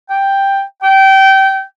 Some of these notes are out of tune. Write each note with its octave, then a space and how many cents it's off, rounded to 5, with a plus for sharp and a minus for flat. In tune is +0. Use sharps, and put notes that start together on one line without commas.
G5 +5
G5 -25